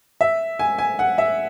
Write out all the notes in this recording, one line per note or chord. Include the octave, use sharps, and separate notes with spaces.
E5
G#5
G#5
F#5
E5